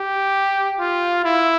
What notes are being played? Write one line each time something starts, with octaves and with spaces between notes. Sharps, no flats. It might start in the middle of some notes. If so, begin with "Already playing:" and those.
Already playing: G4
F4
E4